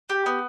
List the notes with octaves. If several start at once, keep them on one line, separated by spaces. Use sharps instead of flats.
G4
B3